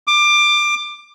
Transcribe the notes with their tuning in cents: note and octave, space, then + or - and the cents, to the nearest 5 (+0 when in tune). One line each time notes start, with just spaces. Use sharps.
D6 +20